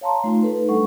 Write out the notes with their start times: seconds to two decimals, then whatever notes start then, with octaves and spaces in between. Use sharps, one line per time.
0.01 C#5 F5 A5 A#5 C6
0.24 A3 D#4 F4
0.43 D#4 A4 B4
0.69 G3 A3 D4 A4 F#5 C#6